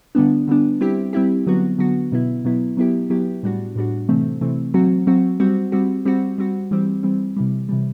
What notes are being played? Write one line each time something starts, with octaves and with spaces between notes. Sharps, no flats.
D3 G3 B3 D4
D3 G3 B3 D4
G3 C4 E4 G4
G3 C4 E4 G4
D3 F#3 B3 F#4
D3 F#3 B3 F#4
B2 F#3 B3 E4
B2 F#3 B3 E4
F#3 B3 E4 G4
F#3 B3 E4 G4
A2 G3 D4 F#4
A2 G3 D4 F#4
C3 E3 A3 C4
C3 E3 A3 C4
F#3 C4 F#4
F#3 C4 F#4
G3 C4 F#4
G3 C4 F#4
G3 C4 F#4
G3 C4 F#4
E3 G3 C4
E3 G3 C4
C3 E3 G3
C3 E3 G3